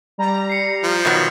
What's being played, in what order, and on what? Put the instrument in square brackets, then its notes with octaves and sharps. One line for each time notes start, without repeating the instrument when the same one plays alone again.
[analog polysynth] G3 A#5
[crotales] C7 C#7
[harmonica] F3
[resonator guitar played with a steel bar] B2 D#3 F#3 [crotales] A6